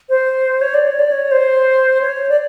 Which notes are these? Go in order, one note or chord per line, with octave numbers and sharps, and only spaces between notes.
C5
C#5
D5
C#5
D5
C#5
C5
C#5
D5